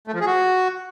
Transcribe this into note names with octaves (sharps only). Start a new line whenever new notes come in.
A3
F3
G#4
F#4